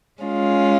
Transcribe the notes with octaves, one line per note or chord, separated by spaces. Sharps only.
G#3 C#4 F4